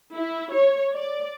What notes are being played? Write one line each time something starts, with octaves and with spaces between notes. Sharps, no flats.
E4
C#5
D5